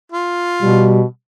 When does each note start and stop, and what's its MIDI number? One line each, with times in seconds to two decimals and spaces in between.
0.12 0.95 65
0.62 1.04 47
0.62 1.03 55